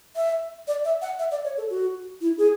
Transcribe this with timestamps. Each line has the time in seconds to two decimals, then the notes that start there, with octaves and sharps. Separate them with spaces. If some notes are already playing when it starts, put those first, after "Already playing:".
0.16 E5
0.68 D5
0.85 E5
1.02 F#5
1.19 E5
1.31 D5
1.45 C#5
1.57 A4
1.70 F#4
2.21 E4
2.38 G#4